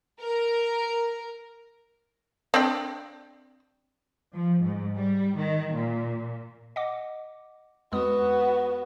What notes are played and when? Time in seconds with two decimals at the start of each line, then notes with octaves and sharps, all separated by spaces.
0.21 A#4
2.54 C4 D4 G5
4.33 F3
4.63 G#2
4.97 G3
5.36 D#3
5.75 A#2
6.76 D#5 F#5 D6
7.93 F2 G#3 B3 F#4 D#6